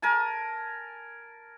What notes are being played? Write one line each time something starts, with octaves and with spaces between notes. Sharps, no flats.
A#4 G#5 A5